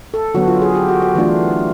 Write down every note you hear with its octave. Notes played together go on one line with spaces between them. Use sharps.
A4
D3 F#3 B3 F#4
F4
G#4
G4
F#4
F#4
E3 A3 D4 F4